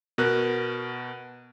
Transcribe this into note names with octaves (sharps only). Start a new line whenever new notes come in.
B2 A#4 F#6